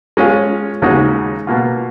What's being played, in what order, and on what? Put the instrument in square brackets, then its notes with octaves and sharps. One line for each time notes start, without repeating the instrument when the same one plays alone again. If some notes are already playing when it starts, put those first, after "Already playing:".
[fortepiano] G#3 C#4 F4
D#2 C#3 G#3 D#4 F#4
B2 A#3 F4